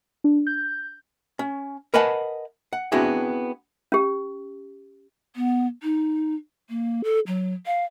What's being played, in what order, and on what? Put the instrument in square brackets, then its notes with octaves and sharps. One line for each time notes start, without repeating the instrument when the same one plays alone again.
[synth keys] D4
G6
[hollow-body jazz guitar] C#4
A#4 B4 D#5 F#5 G#5 A5
F#5
B3 C4 D4 E4 F#4 G#4
[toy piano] C#4 G4
[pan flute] B3
D#4
A#3
A4
F#3
F5